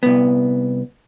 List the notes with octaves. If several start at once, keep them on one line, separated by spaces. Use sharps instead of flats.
C2 B3